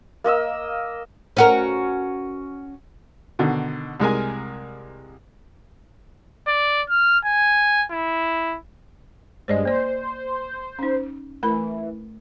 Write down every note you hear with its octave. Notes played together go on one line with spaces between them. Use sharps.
A#3 A#4 D#5 E6
C#4 F#4 A#4
B2 D3 D#3
C2 G#3 A#4 G#5
D5
F6
G#5
E4
G2 G#3 C5 D5 D#5
A#3 C5 D5
C#4 D#4
E3 A3 A#4 B5